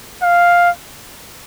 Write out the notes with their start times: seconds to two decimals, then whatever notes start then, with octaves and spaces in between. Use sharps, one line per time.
0.23 F5